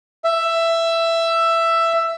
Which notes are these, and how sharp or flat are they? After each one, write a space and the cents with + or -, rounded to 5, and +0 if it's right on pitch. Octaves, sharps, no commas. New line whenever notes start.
E5 +10